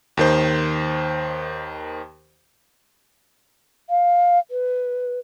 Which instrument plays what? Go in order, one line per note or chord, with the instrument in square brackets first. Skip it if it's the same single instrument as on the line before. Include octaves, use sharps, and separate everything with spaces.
[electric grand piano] D#2 D#3 C5
[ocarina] F5
B4